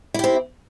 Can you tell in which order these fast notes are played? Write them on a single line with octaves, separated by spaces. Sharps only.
E4 G4 C4